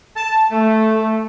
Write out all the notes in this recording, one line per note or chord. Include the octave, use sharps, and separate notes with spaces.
A5
A3